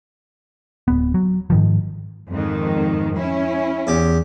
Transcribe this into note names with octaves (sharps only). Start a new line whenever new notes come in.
D1 B3
F#3
G#2 D#3 F3
F2 G#2 D#3
C#4 E4
E2 G4